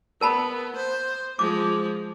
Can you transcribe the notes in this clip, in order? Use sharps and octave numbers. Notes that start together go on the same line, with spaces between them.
B3 A#4 A5 B5
C5
F3 G#3 D6